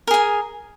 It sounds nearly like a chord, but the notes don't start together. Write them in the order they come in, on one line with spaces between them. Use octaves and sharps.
A#4 G#4 G#5